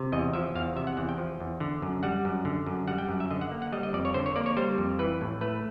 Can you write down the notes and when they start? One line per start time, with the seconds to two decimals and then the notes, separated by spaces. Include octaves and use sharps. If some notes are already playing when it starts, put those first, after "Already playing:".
Already playing: C3
0.12 E2 D#5
0.33 F3 E5
0.55 E2 F5
0.76 C3 E5
0.87 F#5
0.97 E2 F#5
1.09 G5
1.18 F3
1.40 E2
1.60 D3
1.82 F#2
2.03 G3 F#5
2.25 F#2
2.45 D3
2.66 F#2
2.88 G3 F#5
2.98 G5
3.09 F#2
3.20 E5
3.31 D3 D#5
3.41 F#5
3.51 A#3
3.62 F#5
3.72 G3 D#5
3.83 D#5
3.93 F2 D5
4.05 C#5
4.14 D3 C5
4.26 C#5
4.36 A#3 D5
4.46 C#5
4.57 G3 C5
4.78 F2
4.99 E3 B4
5.21 A2
5.41 A3 B4